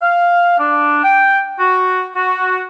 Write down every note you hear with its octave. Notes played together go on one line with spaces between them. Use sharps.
F5
D4
G5
F#4
F#4